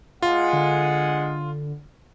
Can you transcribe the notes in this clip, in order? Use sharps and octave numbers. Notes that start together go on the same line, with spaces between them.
G#3 F4 F#5 G#5
D3